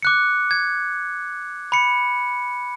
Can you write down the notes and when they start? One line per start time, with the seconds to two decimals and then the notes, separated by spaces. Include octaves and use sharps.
0.02 D6 F#6 C#7
0.51 G#6
1.72 B5 C#7